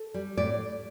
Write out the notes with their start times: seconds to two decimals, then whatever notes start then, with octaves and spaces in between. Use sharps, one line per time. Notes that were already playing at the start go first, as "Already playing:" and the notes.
Already playing: A4
0.14 G3
0.37 A2 D5